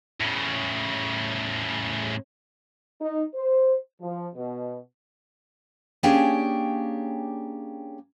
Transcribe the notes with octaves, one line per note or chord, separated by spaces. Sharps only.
A2 C#3
D#4
C5
F3
B2
A#3 C#4 D4 G4 G#4 G5